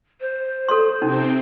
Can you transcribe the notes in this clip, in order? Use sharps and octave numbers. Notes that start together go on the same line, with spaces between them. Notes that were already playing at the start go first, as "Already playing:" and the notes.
C5
A4 D5 C6
C3 C4 C#4 D#4